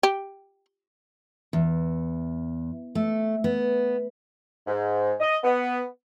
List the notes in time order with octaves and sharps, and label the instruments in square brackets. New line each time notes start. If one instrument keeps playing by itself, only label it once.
[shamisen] G4
[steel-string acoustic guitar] E2
A3
B3
[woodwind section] G#2
D#5
B3